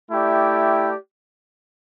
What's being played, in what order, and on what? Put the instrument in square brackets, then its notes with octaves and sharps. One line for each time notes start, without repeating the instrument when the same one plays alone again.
[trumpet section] A3 E4 G4 D5 G5